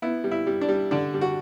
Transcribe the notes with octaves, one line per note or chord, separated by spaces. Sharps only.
B3 E4
G3
E4
G3
D4
G3
D3 D4
G3
F#4